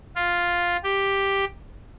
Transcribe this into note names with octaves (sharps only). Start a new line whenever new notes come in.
F4
G4